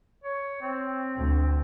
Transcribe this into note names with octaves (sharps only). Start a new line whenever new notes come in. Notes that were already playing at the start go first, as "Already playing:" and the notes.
C#5
C4
D2